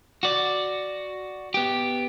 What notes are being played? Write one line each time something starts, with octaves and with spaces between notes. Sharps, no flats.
F#4 D5
B3 G4